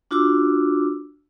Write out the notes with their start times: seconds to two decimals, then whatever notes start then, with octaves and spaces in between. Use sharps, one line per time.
0.11 D4 F4 F#4 D6 E6